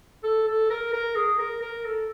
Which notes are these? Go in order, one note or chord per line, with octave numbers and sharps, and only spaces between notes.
A4
A4
A#4
A#4
G#4
A#4
A#4
A4